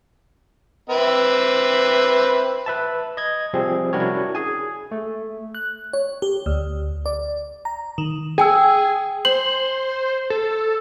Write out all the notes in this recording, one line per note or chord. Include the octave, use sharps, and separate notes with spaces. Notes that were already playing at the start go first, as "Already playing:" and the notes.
C4 B4 E5
B4 E5 A5
D#5 G#6
C3 F3 G3 C4 G#4
C#4 D4 E4 F#4 A#4 C#5
G#4 G#5
A3
F#6
C#5
G4
D2
D5
A#5
D#3
G#4 G5 G#5 E6
C5 F#7
A4